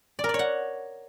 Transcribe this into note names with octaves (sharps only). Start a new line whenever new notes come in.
D5
A#4
D5
C#5
F#5